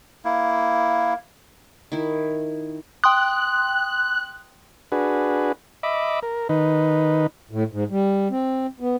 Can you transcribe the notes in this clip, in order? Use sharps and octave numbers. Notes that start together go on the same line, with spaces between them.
A#3 E4
D#3 E4
G5 C6 D#6 F#6
D4 F#4 G#4 B4
D#5 E5 B5 D6
A#4
D#3 D#4 B4
A2
G#2
G3
C4
B3